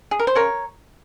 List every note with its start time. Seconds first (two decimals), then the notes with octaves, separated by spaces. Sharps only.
0.11 G#4
0.19 A#4
0.27 C5
0.35 C#3 A#4 C#5